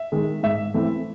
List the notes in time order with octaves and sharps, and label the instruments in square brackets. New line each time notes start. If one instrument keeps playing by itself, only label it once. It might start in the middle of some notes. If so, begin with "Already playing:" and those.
Already playing: [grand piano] E5
D#3 G#3
G#2 E5
E3 A3 C4